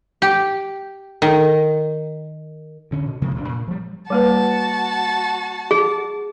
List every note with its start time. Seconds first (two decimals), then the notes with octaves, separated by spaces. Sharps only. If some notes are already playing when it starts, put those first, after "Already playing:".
0.22 G4
1.22 D#3
2.91 D2 D3 C#4
3.06 B2
3.22 C3 F3 G#3 A#3
3.35 B1 F#2 E3 D4
3.49 A#2
3.67 F3 G3
4.10 G3 A#3 F#4 B4 A5
5.71 G#4